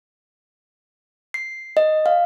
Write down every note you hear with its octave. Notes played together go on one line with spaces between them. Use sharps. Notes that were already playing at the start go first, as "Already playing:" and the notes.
C7
D#5
F5